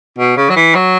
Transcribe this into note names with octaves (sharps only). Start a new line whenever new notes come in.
B2
C#3
F#3
E3
F#3